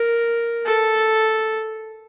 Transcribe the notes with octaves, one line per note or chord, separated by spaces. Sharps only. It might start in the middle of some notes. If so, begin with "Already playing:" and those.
Already playing: A#4
A4